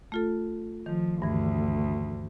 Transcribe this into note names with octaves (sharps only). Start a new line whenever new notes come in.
A3 F4 A4
D#3 F3
D2 G2 E3